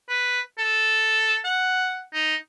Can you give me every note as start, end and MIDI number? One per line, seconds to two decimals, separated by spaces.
0.09 0.40 71
0.58 1.39 69
1.44 2.02 78
2.14 2.35 63